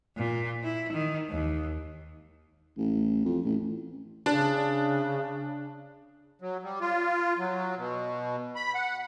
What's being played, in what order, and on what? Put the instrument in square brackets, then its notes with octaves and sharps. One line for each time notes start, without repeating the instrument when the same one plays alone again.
[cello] A#2
E4
D#3
D#2
[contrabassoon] A1
F2
A1
[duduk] C#3 [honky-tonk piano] D4
[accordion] F#3
G3
F4
F#3
B2
B5
F#5